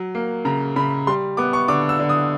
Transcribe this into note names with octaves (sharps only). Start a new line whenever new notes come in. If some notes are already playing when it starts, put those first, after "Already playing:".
Already playing: F#3
A#3
C#3 A#5
C#3 B5
G3 C6
B3 D6
C#6
D3 D6
E6
D3
D#6